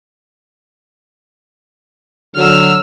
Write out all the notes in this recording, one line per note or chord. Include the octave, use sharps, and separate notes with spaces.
D3 F#3 E6 F6